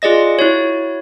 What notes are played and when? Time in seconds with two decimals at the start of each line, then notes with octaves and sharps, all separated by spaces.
0.02 F4 G#4 D5 D#5 A#6
0.39 E4 F#4 C#5